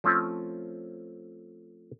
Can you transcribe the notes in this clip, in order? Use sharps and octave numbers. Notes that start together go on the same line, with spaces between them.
F3 A3 C4 C#4 F4